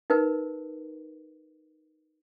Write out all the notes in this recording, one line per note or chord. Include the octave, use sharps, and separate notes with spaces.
D#4 A#4 B4